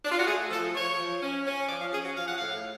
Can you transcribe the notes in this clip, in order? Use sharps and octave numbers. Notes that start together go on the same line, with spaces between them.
D4
F4
F#4
A3 G#4
F3 A4
F3 C#5
F3
C#4
C#4
F3 D5
F5
C#4 G#4
F#4
F3 F5
F#5
A2 F5